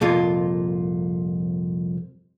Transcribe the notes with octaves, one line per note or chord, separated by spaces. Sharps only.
C2 F2 A#2 F4